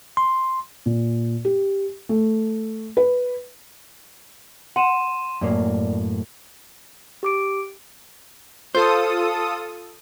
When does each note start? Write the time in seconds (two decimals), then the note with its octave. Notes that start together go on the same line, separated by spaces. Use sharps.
0.17 C6
0.86 A#2
1.45 G4
2.09 A3
2.97 B4
4.76 F#5 C6 D#7 E7
5.41 F#2 A2 A#3 D5
7.23 G4 D6 D7
8.75 F4 A4 C5 D#6